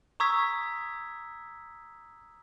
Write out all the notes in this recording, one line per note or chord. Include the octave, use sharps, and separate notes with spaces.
A#5 C#6 D#6 E6 G#6 B6